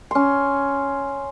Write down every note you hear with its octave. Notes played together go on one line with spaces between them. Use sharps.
C#4 C6